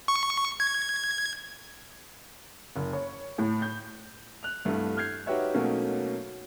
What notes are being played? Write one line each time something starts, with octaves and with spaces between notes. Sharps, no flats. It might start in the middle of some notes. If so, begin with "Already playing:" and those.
C#6
G#6
F#1
C#5
A2
G6
F#6 F7
C2 G2 A3
F6 G6 G#6 C7
D#4 F#4 G4 B4 C#5 E5
B2 F#3 A3 A#3 C#4 D#4